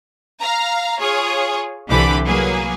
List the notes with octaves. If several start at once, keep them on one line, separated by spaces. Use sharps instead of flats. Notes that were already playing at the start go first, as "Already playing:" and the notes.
F5 A#5
F4 G#4 C#5
C2 D3 E3 G4 B5 D6
F#3 A#3 G#4 B4